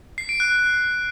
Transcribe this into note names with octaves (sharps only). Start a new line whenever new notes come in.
C7
D7
F#6